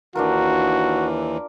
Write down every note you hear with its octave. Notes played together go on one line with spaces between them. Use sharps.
D#2 E3 D4 F4 F#4 A#4